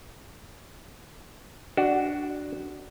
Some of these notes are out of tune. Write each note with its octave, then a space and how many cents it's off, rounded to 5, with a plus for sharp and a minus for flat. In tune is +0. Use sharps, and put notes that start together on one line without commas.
D4 +5 F#4 +10